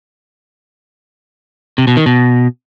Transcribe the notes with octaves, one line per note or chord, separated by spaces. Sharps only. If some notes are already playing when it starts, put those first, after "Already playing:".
C3
B2
D#3
B2